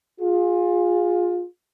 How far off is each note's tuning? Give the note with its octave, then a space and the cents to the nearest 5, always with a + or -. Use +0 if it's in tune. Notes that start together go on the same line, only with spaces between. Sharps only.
F4 +20 G#4 -15